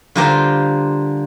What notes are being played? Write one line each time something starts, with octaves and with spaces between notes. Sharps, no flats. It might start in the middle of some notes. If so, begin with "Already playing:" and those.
D3 G3 F4 G4 A#4 C5